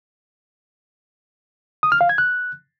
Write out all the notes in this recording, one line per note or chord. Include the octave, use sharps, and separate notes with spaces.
D#6
F6
F5
G#6
F#6